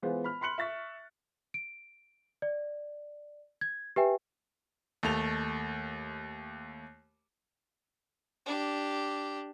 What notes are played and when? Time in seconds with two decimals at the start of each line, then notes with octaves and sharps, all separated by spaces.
0.02 E3 G#3 B3 F4 C5
0.24 B5 F6
0.41 B5 C6 F#6 C#7 F#7
0.58 E5 C#6 A6 B6
1.54 D7
2.42 D5
3.61 G#6
3.96 G4 B4 E5 G5 G#5
5.03 D#2 A3 F7
8.46 D4 G4